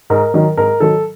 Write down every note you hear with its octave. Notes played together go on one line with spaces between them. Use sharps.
G#2 A#4
D#3 F#3
G#2 A#4
D#3 F#3 A4